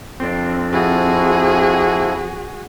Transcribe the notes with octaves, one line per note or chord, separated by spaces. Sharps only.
F2 C4 D4
F3 E4 F#4 G#4